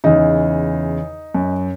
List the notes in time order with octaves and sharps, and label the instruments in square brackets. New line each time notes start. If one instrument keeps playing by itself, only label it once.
[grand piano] E2 C#3 [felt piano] D#4
[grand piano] F#2